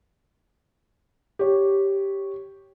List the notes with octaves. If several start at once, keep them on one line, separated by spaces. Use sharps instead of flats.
G4 C#5